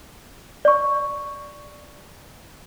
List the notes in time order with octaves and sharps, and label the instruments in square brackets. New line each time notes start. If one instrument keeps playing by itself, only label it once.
[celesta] D5 C#6